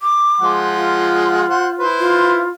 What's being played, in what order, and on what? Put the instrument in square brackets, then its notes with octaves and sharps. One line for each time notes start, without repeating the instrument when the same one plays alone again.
[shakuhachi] D6
[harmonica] F3 G#3 F#5
[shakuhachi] F4
[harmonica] C5 F#5
E4 B4 C5
[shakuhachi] F4